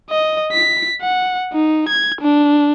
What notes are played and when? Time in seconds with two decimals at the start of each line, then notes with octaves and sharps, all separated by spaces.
0.10 D#5
0.52 B6
1.01 F#5
1.53 D#4
1.88 G#6
2.21 D4